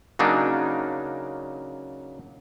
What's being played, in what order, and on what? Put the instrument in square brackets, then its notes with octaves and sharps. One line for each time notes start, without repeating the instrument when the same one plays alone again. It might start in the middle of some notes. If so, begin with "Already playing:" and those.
[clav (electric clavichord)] C#3 F#3 A#3 D4 D#4